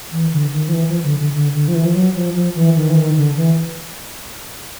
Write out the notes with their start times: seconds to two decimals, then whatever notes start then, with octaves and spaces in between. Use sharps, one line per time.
0.12 E3
0.32 D3
0.53 D#3
0.69 F3
0.73 E3
0.88 F3
1.04 D3
1.19 D3
1.34 D3
1.54 D3
1.68 F3
1.75 E3
1.85 F3
1.95 F#3
2.15 F3
2.35 F3
2.55 E3
2.76 D#3
2.90 E3
2.96 D#3
3.17 D3
3.36 E3